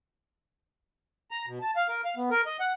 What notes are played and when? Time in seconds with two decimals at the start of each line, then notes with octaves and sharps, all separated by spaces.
1.31 A#5
1.47 B2
1.62 A5
1.76 F5
1.88 A#4
2.05 F5
2.16 B3
2.31 A#4
2.46 D#5
2.60 F#5